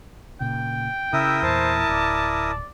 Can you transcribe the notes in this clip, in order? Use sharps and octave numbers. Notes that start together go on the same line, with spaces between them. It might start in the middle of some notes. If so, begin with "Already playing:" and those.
A#2 C#3 G5
C#3 E4 A#4 E5 D#6
E2 A#2 C5 A5
D1 D5